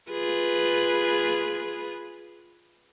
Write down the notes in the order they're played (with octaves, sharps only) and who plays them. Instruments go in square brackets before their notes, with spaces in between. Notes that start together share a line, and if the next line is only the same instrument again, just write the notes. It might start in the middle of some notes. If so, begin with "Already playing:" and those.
[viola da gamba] F4 G#4 B4